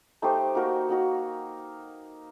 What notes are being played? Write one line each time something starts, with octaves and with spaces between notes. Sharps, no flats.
A3 D#4 G4 C5
A#3 D#4 F#4 A#4
A#3 D#4 F#4 A#4